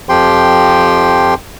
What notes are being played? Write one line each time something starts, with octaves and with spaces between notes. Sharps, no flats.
F2 F3 G4 G5 C6